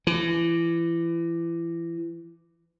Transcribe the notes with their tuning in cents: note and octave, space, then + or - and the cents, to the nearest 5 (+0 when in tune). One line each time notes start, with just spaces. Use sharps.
E3 +30